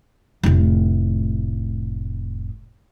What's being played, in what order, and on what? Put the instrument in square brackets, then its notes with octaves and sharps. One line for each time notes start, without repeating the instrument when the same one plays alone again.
[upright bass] F1 A2